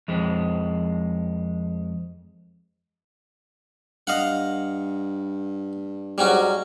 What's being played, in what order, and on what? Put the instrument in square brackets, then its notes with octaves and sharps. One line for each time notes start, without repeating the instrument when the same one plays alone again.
[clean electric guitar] F2 G#3
[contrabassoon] G2 [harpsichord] D#5 F5 F#5
[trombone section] G#2 F#3 [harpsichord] G3 C#4 F#4